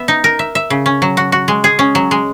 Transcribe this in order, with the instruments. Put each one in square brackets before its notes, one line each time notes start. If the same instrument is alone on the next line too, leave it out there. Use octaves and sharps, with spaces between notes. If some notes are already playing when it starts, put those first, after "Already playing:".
Already playing: [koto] B3 E5
D#4
A#4
E5
E5
C#3
C#4
F#3
F#4
F#4
G#3
G#4
C#4
F#3
G#3